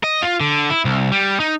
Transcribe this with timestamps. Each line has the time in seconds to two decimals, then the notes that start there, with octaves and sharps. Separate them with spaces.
0.04 D#5
0.22 F4
0.40 D3
0.70 E4
0.85 C2
1.12 G3
1.40 D#4